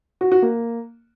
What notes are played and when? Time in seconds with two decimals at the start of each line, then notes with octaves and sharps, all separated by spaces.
0.21 F#4
0.32 F#4
0.42 A#3